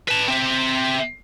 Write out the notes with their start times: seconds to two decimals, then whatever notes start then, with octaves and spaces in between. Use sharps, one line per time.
0.09 B4 A5
0.28 C4 E5